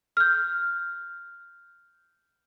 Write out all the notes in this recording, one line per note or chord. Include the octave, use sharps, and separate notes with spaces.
F6 G6